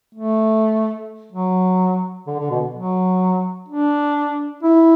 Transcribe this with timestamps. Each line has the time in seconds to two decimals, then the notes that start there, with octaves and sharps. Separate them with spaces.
0.15 A3
1.32 F#3
2.27 D3
2.39 D3
2.51 B2
2.75 F#3
3.69 D4
4.63 E4